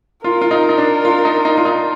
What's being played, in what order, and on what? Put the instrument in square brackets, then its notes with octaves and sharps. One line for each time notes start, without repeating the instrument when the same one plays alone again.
[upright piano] F4 [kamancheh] A#4
[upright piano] F4
D#4
D#4
D4
F4
D#4
D#4
F4
D#4